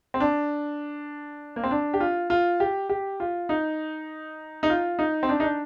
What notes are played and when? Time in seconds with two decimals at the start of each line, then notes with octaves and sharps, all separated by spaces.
0.14 C4
0.20 D4
1.56 A#3
1.64 C4
1.71 D4
1.94 G4
2.00 F4
2.30 F4
2.60 G4
2.89 G4
3.20 F4
3.49 D#4
4.63 D#4
4.70 F4
4.99 D#4
5.23 C4
5.29 D4
5.40 D#4
5.43 D4